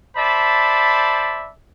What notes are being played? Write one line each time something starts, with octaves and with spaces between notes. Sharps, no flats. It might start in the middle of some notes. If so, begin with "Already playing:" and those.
C5 D5 E5 A5 B5